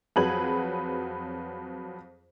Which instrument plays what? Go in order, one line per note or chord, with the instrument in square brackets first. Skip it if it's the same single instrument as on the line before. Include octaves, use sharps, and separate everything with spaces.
[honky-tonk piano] F2 F#3 G#4 B4 G#6 F#7